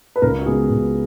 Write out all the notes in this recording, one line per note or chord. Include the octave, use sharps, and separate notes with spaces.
B4
C#2 A#4
F#4
C#3 G#3 B3 G#4
C#2